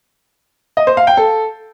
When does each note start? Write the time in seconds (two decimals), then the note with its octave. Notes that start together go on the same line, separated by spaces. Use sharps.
0.77 D#5
0.87 C5
0.97 F5
1.07 G5
1.17 A4